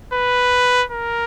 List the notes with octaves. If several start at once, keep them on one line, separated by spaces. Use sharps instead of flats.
B4
A#4